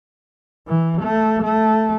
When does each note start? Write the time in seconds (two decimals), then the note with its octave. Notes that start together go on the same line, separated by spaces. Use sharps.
0.67 E3
1.02 A3
1.43 A3